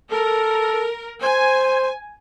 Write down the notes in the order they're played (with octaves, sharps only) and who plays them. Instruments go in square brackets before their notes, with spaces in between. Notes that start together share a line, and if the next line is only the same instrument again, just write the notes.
[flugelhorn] A4 [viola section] A#4
[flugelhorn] C5 [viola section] G#5